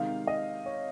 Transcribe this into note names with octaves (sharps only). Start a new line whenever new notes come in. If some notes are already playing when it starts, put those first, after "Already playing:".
Already playing: C3 D#3 G#3 D#4 F5
D#5
C#5